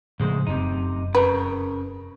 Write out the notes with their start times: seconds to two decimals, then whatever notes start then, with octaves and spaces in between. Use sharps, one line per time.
0.20 C2 A2 C#3 F3 G#3 C5
0.47 F1 F#2 C3 D#4
1.15 C#3 A#4 B4